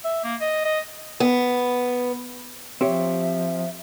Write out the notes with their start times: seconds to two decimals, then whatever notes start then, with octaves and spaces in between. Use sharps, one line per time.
0.04 E5
0.24 A#3
0.41 D#5
0.65 D#5
1.20 B3
2.81 F3 C4 G4 C#5 E5